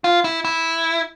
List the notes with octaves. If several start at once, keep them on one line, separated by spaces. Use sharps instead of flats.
F4
E4
E4